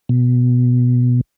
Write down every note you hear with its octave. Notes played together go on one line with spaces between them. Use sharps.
B2